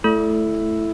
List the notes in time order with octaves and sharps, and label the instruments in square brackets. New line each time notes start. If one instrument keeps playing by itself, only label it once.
[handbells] A3 A4 [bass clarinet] E4